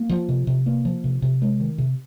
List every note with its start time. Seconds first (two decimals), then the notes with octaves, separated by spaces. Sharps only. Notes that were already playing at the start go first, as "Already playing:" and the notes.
Already playing: A#3
0.09 F3
0.29 C3
0.47 C3
0.66 A#3
0.85 F3
1.04 C3
1.22 C3
1.42 G#3
1.60 D#3
1.78 C3